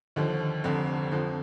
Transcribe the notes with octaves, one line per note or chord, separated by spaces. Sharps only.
D#2 D3 F3
F1 F2 D3
F2 D3 F3